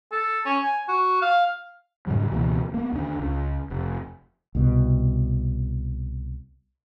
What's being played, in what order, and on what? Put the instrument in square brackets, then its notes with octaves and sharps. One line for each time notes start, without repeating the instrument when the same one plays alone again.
[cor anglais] A4
C#4
G#5
F#4
F5
[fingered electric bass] G#2 C#3 F#3 G3
C#2 B2 E3 A#3
A#3 B3
D#2 D3 D4
C#2
F1
[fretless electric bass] C2 B2